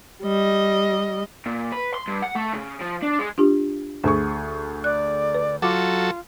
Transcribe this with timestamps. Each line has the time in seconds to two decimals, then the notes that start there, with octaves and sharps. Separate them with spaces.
0.23 G3 D#5
1.46 A#2
1.72 B4
1.94 C6
2.07 G2
2.23 F#5
2.36 A3
2.53 C#3
2.81 F3
3.02 D4
3.19 G#3
3.38 D4 F4 G4
4.04 D2 D3 G#4 C#6
4.84 D5 F#6
5.34 B4
5.62 F#3 F4 A4 F#5 D6